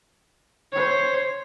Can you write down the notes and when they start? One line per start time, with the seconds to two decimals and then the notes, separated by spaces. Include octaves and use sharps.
0.72 C5 C#5